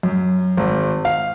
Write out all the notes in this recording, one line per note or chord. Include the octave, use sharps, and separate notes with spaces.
F#2
G#1
F5